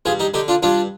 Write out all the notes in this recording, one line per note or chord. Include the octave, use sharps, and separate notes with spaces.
G2 F4 G#4
D#4 G4
D3 D#4 G4
D4 F4
G2 D4 F4